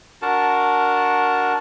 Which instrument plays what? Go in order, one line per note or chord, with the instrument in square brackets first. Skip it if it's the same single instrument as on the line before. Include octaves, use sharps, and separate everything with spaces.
[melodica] D4 F#4 A#4 A5